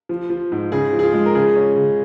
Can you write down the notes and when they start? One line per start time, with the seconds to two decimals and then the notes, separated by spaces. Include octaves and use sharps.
0.09 F3
0.30 F3
0.52 G#2
0.72 C#3 G#4
0.93 F3
0.99 G#4
1.03 F4
1.14 G#3
1.26 A#4
1.35 C#3 G#4
1.56 C#4
1.76 C#3